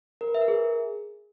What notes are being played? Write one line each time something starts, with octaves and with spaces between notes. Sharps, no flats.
A#4
B4
E5
A#4
G#4